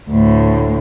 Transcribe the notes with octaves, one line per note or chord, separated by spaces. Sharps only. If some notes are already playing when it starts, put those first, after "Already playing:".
D2 A2